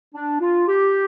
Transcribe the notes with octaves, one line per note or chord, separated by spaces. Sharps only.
D4
F4
G4